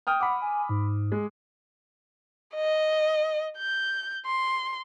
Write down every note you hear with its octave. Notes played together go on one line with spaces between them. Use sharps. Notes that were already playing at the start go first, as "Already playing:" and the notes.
G5 D#6 F6
F#5 B5 D6
G#5
G#2
G#3
D#5
G6
C6